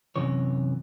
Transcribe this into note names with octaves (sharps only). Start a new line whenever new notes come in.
F#2 C3 E3 C#5